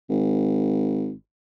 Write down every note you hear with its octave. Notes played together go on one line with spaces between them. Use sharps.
G#1